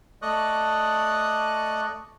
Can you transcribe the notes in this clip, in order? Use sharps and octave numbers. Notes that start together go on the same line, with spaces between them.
A3 D5 D#5 C#6 D#6 F#6